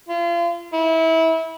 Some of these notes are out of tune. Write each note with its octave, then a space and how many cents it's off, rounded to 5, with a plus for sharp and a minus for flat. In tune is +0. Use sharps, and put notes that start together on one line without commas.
F4 -35
E4 -25